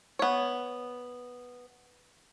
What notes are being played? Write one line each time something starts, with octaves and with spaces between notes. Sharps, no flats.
B3 C#5